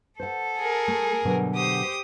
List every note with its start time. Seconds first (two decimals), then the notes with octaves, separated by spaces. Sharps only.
0.20 A4 C5 F#5
0.59 G#4 A#4
0.88 A3
1.25 G2 B2 D3 F#3
1.56 G4 C5 D#6